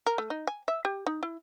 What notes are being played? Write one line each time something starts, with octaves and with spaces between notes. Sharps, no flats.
A#4
A3
D#4
G#5
E5
G4
D#4
E4